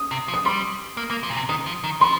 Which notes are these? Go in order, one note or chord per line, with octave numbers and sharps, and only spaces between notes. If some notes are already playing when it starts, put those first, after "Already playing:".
Already playing: D#6
C3
F3
D#6
G3 C6
A#3
A#3
F3
A#2
C3
D#3 D#6
F3
D#3
F3 C6